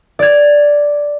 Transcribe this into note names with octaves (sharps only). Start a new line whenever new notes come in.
D5 G#6